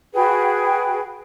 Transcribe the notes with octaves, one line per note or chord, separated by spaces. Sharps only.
F#4 G#4 B4 G5